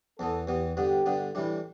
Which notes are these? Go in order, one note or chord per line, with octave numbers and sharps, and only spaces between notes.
E2 E3 B3 A4
E2 E3 B3 G4
G2 D3 B3 G4
G2 D3 B3
A2 E3 G3 D4 E4